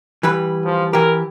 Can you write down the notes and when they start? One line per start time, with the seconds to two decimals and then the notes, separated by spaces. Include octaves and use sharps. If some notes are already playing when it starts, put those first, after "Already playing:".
0.23 E3 G3 B4
0.65 F3
0.93 E3 G4 A#4